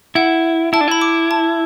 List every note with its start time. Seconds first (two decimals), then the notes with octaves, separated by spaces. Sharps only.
0.15 E4 F#5
0.73 E4 A5
0.81 D4
0.88 E4 B5
1.01 D6
1.31 A5